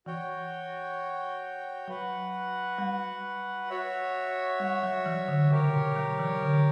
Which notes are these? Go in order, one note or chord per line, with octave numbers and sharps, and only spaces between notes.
E3 F#4 C#5 G5
F#3 F#4 B4 F#5
G3
F#4 C#5 E5
G3
F#3
E3
D3
C#3 G4 A#4 C#5
B2
F#3
E3
D3